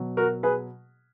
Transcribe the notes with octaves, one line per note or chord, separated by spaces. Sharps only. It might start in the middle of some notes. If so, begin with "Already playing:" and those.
Already playing: B2 F#3
F#4 A#4
G#4 B4